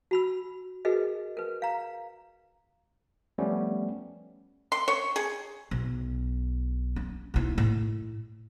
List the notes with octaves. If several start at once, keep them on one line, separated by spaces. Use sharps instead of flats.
F#4 B5 E6
F#4 G#4 A#4 B4 D#5
A#4 B4
F5 A#5
F3 G3 A3 B3 C#4
C6
C#5
G#4
B1
C#4
B1 E4
A2